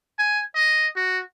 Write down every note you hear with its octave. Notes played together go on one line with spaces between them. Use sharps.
G#5
D#5
F#4